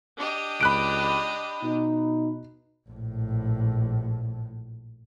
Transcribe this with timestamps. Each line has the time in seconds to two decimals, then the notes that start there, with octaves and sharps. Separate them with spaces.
0.18 D4 G4 D#5
0.61 C#2 B5 F#6 D7
1.63 B2 D#4
2.89 A#1 A2